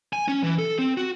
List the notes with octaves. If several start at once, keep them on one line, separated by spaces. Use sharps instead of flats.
G#5
C#4
E3
A4
C4
F#4